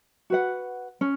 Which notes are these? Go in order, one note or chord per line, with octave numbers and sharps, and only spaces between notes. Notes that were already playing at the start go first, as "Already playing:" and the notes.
F#4 B4 F#5
C#4